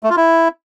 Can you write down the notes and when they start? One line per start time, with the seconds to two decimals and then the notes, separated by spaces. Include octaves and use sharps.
0.03 A3
0.10 F4
0.17 E4